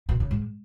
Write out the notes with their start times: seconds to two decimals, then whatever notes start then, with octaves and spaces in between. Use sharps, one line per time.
0.09 B2
0.20 C#3
0.31 G#2